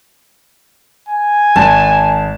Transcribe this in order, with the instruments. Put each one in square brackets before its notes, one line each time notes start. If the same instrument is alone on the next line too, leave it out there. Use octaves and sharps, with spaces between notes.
[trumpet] G#5
[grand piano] G#1 [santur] A5